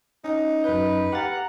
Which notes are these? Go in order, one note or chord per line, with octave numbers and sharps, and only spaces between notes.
C#4 D#4
F#2 B4 G6
G4 F5 F#5 A#5 A6